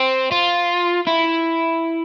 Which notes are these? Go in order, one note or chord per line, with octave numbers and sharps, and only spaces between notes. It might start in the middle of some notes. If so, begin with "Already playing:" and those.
Already playing: C4
F4
E4